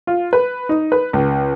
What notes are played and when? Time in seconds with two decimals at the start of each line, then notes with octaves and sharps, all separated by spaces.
0.07 F4
0.33 B4
0.69 D#4
0.92 B4
1.13 C#2